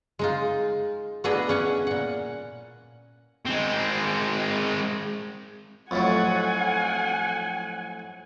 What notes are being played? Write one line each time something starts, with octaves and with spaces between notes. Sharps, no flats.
G#3 D#4 F4
A3 B3 D4 E4 G#4 D#5
C#4 F#5 G#5
A#2 F#5
G#3 C4
F2 A2 F#3 F#5 G#5